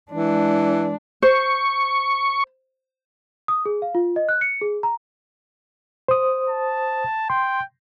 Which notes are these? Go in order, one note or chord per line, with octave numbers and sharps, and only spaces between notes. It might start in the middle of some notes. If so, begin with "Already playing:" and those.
E3 G#3 D4
C5 C#6
D#6
G#4
F5
F4
D#5
F#6
C#7
G#4
A#5
C5 D#6
A5
G5 C6